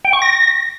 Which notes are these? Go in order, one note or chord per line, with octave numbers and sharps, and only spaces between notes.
G5
C#6
A#6